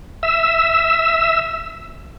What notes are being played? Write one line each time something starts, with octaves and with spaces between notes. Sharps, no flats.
E5 E6